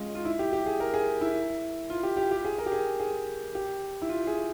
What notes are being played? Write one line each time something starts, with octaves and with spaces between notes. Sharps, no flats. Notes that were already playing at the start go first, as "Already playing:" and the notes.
Already playing: G#3 C#4 F4
F4
E4
G4
G4
G#4
A#4
G#4
E4
F4
G4
G4
G4
G#4
A#4
G4
G#4
G#4
G4
E4
F4
G#4